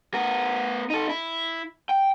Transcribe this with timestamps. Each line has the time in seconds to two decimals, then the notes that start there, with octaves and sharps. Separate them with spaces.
0.14 B3 A#4
0.90 D#4 A4
1.09 E4
1.89 G5